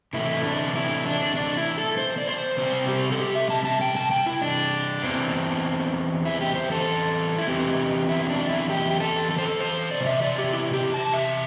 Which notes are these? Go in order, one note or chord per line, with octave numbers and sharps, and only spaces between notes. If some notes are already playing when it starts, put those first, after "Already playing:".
C3 E3 A3 E4
D4
E4
D4
D4
E4
A4
C5
D5
C5
C3 E3 G3 C4 C5
G4
A4
G4
E5
A5
A5
G5
A5
G5
E4
D4
E2 E3 C4
E4
G4
C5
A4
E4
E2 E3 C4 G4
E4
D4
E4
G4
G4
A4
A4
C5
A4
C5
E2 C3 D5
D5
E5
D5
G4
E4
G4
A5
E5